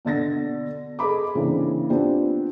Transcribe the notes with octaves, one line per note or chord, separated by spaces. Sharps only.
B2 D3 A6 A#6
G#4 A4 D#5 B5 D6
C#3 E3 A#3 C4 D4
B3 C4 D4 F4 G4